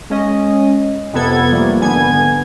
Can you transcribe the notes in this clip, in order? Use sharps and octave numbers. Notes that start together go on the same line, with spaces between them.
G#3 C#4 D#5
F2 C3 B3 A4 G#6
F3 G3 A3 A#3
G#1 D3 B3 G#5 G#6